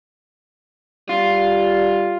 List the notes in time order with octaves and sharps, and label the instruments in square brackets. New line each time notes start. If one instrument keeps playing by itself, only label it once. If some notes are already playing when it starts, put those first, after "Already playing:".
[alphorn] G3 [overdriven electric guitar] F4